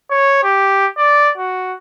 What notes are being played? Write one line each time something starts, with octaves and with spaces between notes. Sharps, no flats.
C#5
G4
D5
F#4